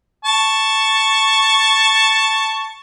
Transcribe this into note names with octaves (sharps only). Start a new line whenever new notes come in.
A5 C#6